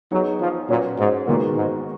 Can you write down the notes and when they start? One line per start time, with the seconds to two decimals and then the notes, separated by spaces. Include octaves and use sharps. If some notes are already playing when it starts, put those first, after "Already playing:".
0.12 F#3 B3 D#4 G#4 C#5
0.41 F3
0.69 A#2 F#3 C#4 F#4 B4
0.99 G#2
1.27 A#2 D#3 G#3 B3 F#4 A#4
1.56 G#2